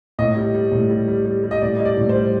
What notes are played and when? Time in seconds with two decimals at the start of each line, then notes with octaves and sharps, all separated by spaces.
0.19 A2 D#5
0.37 G3
0.54 G3
0.72 A2
0.90 G3
1.08 G3
1.26 G3
1.43 G3
1.51 D#5
1.62 A2 D5
1.78 G3 D#5
1.85 D5
1.97 A2
2.09 C5
2.15 G3